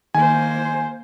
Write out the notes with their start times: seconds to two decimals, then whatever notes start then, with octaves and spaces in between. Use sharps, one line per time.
0.14 D#3 A#3 C5 G#5